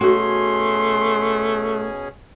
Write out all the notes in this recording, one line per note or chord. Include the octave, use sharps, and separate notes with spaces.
B2 A3 C#4 F#4 G#4 C6